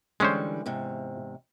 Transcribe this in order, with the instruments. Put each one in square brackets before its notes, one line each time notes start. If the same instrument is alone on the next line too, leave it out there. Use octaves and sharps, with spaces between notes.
[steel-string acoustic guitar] D3 E3 G3 [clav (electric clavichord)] G#3 C#4 C5
[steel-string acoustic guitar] E2 G#2 C3